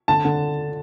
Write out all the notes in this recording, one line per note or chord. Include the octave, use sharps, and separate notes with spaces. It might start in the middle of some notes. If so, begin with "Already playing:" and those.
D3 A5
D3